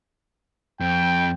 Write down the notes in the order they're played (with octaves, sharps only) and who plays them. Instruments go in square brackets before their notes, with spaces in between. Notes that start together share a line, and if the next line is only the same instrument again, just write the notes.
[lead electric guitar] F2 [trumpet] G5